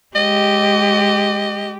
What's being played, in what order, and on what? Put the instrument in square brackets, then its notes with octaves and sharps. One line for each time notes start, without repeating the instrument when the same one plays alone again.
[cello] G#3 G4 [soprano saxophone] D#5